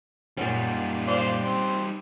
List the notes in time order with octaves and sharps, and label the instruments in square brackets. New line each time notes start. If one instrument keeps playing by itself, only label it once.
[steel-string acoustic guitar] F#2 A#2 [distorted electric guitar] G3 D#4
[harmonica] C5 D5 F5
C4